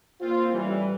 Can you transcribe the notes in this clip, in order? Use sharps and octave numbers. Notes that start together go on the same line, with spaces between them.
A#2 C4 F4
A1 E3 G3